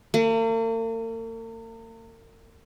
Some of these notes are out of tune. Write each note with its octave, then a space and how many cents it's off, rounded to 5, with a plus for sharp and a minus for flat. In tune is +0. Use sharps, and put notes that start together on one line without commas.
A#3 -45